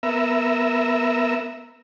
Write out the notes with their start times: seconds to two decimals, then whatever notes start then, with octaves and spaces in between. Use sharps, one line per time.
0.03 B3 A#4 E5